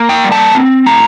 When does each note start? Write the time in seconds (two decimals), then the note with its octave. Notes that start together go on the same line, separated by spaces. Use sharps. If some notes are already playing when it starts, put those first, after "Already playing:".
Already playing: A#3
0.09 G5
0.24 G3
0.32 A5
0.55 C4
0.86 A2 A#5